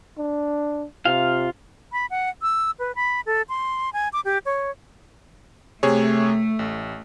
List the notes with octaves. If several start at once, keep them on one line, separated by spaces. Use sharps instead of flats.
D4
C3 F4 F5
B5
F#5
E6
B4
B5
A4
C6
G#5
D6
G4
C#5
C3 A3 G#4 C#5
A1